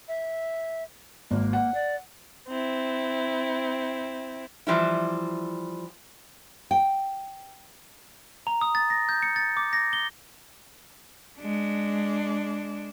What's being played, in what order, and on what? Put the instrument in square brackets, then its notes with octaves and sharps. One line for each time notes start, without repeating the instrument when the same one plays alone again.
[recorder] E5
[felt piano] G#1 [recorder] A#3
[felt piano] F#5
[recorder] D5
[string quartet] C4 E4
[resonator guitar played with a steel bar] E3 F3 G3 E4
[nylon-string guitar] G5
[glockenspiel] A#5
D#6
A6
A#6
G6
C#7
A6
D6
A#6
G7
[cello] G#3 D4